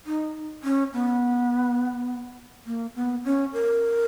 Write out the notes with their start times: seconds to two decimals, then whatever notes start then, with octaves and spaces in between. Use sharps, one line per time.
0.06 D#4
0.63 C#4
0.93 B3
2.66 A#3
2.95 B3
3.25 C#4
3.53 A#4